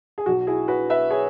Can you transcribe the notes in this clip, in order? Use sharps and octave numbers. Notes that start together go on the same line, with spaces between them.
G#4
B1 B2 F#3 F#4
E4 G#4
F#4 B4
B4 E5
G#4 C#5